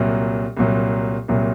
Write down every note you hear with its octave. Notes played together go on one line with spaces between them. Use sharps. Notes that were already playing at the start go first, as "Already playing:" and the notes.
Already playing: C2 A#2 F#3
C2 A#2 F#3
C2 A#2 F#3